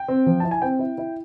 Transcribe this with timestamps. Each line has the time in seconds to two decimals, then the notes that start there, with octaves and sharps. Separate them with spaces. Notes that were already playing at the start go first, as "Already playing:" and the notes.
Already playing: G5
0.08 C4
0.26 F3
0.40 E4 A5
0.51 G#5
0.62 C4 G5
0.79 E4
0.98 E4